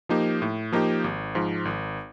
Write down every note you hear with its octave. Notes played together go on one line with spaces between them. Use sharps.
F3 A#3 D#4 G4
A2
F3 A#3 D#4 G4
G#1
G#2 F3
G#1